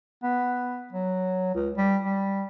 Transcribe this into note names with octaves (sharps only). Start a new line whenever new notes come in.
B3
F#3
C#2
G3
G3